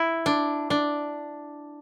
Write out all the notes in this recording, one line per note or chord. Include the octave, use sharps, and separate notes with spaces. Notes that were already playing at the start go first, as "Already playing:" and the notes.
Already playing: E4
D4
D4